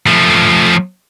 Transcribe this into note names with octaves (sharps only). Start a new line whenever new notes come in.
F3 A3